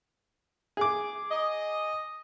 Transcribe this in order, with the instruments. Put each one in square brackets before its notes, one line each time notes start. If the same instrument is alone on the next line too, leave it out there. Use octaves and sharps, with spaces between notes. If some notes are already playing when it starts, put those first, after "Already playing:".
[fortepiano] G#4 D6
[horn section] D#5